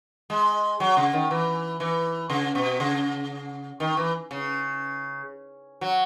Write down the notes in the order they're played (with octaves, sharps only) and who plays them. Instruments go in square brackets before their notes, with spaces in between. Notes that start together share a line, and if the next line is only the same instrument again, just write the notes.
[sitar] G#3
F#3
C#3
D#3
E3
E3
C#3
B2
C#3
D#3
E3
C#3
F#3